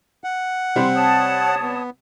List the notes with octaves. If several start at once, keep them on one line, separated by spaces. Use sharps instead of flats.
F#5
C3 G3 C4 C6
C#5 A5 D#6
B3